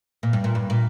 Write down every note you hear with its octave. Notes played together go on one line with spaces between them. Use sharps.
A#2
G2
A#2
G2
A#2